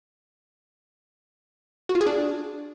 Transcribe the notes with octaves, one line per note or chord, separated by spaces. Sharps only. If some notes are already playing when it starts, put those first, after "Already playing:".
F#4
F4
G#4
D4